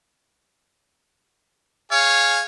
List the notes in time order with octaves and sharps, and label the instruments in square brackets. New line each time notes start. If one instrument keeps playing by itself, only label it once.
[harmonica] G#4 F5 [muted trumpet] C#5